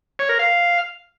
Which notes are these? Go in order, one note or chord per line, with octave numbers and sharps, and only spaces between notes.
C#5
A#4
F5